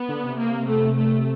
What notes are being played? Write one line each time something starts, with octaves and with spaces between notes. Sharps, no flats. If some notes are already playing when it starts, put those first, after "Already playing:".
Already playing: B3
D3
C3
A#3
A3
A3